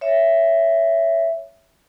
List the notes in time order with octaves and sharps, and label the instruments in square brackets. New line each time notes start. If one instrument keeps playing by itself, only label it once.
[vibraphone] C#5 E5